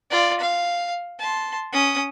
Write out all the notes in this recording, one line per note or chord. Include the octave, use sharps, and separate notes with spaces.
F4 D5
F5
A5 C6
C#4 D#6